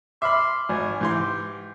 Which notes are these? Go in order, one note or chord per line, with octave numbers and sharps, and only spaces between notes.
E5 B5 C6 D6 F6
G#1 G#5
G#2 E3 G4 C6